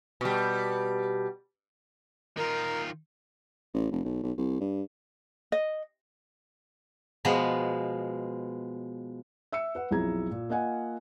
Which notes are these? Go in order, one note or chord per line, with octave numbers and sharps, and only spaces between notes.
B2 G3
D#3 F4 A#4
A1
F1
B1
B1
C2
G2
D#5
B2 F3 G#3 B3
E5 E6 C#7
B4 F#5
B1 F2 E4 G#4 A#5 G#6
A#2
A#3 F4 D#5 F#5 G#5